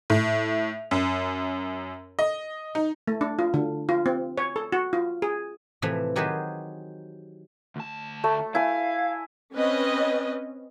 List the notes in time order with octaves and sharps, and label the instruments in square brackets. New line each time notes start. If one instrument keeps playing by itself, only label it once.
[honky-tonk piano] A2
F#2
D#5
D#4
[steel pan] A3
D4
F4
D3
F4
C4
C#5
A4
F#4
F4
G#4
[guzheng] A2 C3 E3 F3 E5
D#3 F#3 G4 G#4 B4 C5
[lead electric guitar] D2 A5
[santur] A3
[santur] E4 G#5 [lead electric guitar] F5
[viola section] C4 C#4 B4 D#5